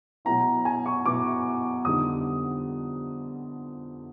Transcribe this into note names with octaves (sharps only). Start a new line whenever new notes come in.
B2 F#3 B3 E4 A#5
G#5
C#6
B2 F#3 B3 E4 D6
F2 D3 G3 B3 D#4 D#6